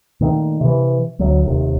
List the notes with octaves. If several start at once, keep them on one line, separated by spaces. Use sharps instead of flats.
A#2 D#3 A3
C3 E3
D2 F#3
D#1 D#2 C3